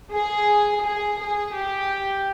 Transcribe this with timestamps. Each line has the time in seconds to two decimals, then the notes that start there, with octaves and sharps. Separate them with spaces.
0.12 G#4
0.83 G#4
1.19 G#4
1.55 G4